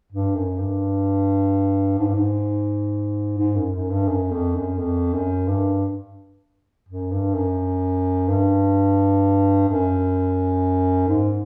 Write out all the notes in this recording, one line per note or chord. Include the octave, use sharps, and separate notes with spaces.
G2
F#2
G2
G#2
G2
G#2
G#2
F#2
F#2
G2
F#2
F2
F#2
F2
F#2
G2
F#2
G2
F#2
G2
F#2
G#2